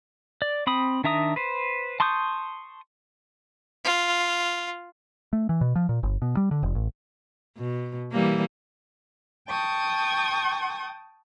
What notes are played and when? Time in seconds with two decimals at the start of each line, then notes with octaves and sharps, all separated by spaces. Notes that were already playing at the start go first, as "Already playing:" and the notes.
0.42 D5
0.67 C4 B5 D#6
1.04 D#3 D4 E5 A#5 D#6
1.36 B4 C5
2.00 A5 C6 C#6 D#6 G6
3.84 F4
5.33 A3
5.49 E3
5.61 B2
5.76 F3
5.89 A#2
6.03 G1
6.22 B2
6.37 G3
6.51 D3
6.63 F1
6.75 A1
7.58 B2
8.12 E3 G3 A#3
9.49 G5 A5 C#6 D#6